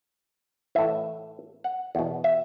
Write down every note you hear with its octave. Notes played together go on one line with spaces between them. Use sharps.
A2 E3 E5
F#5
E2 B2
E5